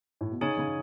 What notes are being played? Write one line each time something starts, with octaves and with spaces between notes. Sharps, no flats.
A2
B2
C#3 D#4 G#4 C#5 G#5
C#3